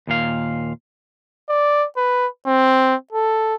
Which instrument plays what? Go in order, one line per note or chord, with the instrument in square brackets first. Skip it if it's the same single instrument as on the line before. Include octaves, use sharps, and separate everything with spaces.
[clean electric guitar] D#2 A#2 F5
[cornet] D5
B4
C4
A4